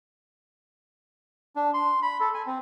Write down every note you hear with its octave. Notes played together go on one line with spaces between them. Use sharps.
D4
C6
B5
A4
G#5
C4